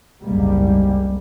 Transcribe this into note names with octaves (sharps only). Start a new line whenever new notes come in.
F#1 C2 G#2 G3 G#3 A#3